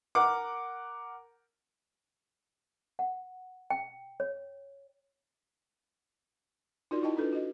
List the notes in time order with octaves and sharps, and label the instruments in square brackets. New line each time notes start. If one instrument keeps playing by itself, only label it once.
[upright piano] A#4 F#5 D6
[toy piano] F#5
G5
C#5
[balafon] D#4 F4 F#4 A#4 D5
D#4 E4 D#5 G5 A5
D4 F4 A4 B4
F#4 D#5